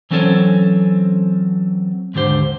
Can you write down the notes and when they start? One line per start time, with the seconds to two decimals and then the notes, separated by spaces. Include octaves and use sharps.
0.11 E3 F#3 C4 C#4 A4 C#5
2.14 D#2 G#2 D3 G4 C5